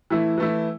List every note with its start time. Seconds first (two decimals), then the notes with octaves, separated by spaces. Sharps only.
0.10 E3 A3 E4
0.38 E3 A3 E4